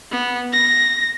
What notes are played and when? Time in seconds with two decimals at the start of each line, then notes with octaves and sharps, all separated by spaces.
0.12 B3
0.53 A#6